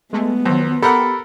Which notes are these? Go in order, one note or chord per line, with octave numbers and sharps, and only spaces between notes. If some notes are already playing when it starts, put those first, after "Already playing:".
G#3 A3 B3
F2 D#3 F#3
G4 A4 A#4 F#5 B5